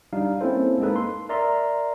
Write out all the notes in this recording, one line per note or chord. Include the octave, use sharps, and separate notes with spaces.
G3 D4 D#4 F5
A#3 C4 C#4 E4 A4 C5
G#3 A#3 D#4 A4 B4
C6
A#4 D5 E5 A#5 C6